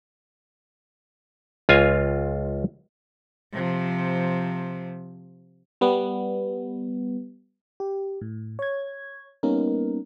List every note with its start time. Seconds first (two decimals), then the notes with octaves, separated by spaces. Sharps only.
1.69 C#2 F4 F5 G#5
3.52 C3 F3
5.81 G3 B3
7.80 G4
8.22 A2
8.59 C#5 G#6
9.43 G3 A#3 B3 C#4 D#4 A#4